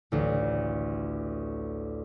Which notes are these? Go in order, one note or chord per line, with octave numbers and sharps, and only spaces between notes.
A1 D2